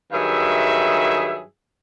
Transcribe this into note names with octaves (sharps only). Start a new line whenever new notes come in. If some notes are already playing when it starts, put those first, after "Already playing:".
G2 D#3 F#3 G#4 E5